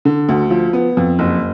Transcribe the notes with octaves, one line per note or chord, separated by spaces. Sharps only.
D3
D2
F3
B3
F2
F#1